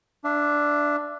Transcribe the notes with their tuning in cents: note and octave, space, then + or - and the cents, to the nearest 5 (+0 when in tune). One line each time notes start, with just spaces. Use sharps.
D4 +0 E5 +30